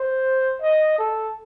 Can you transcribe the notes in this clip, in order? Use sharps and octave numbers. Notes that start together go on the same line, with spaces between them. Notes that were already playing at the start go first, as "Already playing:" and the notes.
Already playing: C5
D#5
A4